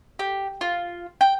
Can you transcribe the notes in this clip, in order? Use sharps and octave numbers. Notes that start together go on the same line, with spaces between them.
G4
F4
G5